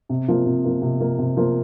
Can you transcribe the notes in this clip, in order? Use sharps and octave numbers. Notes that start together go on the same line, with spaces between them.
C3
F3 A#3
C3
F3 A#3
C3
F3 A#3
C3
F3 A#3